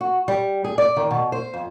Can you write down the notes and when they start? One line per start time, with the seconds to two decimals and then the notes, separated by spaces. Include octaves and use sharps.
0.01 F#4
0.28 G3
0.64 G#4
0.78 D5
0.96 D#3
1.11 B2
1.32 C5
1.54 F2